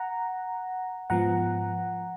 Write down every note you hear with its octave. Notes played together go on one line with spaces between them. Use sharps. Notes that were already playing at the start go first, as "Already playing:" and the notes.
Already playing: F#5 A#5
G#2 F3 B3 F#5 A#5